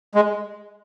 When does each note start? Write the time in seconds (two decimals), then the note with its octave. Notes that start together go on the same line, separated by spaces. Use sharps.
0.15 G#3